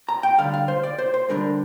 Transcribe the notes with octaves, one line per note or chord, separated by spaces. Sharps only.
A#5
G5
D2 D3 G3 F5
F5
C5
D5
C5
C5
D2 D3 G3 D4 A#4